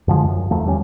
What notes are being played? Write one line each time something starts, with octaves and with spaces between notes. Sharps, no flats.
F#2 D3 F3 G#3
F#2
E2 D#3 F3 A3
E2 G3 C4 C#4